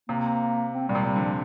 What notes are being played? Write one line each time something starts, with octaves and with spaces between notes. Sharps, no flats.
C3 A#3
C4
A#2 G3
C3
G3
D3
F3